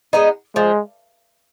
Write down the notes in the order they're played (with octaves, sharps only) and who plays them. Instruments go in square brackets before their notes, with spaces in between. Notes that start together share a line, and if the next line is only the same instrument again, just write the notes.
[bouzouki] G#3 B3 D#4
[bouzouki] F3 [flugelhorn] G#3